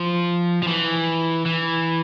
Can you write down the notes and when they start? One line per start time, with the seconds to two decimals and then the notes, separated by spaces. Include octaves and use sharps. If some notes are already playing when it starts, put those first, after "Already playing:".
Already playing: F3
0.63 F3
0.67 E3
1.46 E3